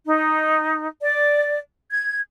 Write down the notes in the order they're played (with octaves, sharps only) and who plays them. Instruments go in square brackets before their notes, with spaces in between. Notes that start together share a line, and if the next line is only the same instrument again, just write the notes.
[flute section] D#4
D5
G#6